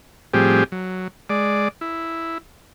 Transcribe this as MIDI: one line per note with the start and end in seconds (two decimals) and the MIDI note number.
0.34 0.64 45
0.34 0.64 53
0.34 0.64 55
0.34 0.64 60
0.34 0.64 67
0.34 0.64 68
0.72 1.08 54
1.30 1.68 56
1.30 1.68 74
1.81 2.38 64